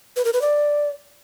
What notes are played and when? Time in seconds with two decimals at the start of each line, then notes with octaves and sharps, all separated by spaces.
0.17 B4
0.25 A#4
0.33 B4
0.42 D5